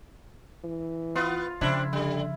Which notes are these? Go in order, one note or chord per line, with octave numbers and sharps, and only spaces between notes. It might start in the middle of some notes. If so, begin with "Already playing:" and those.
E3
B3 F4
C#3 F3 C4 D4 E4
D3 G3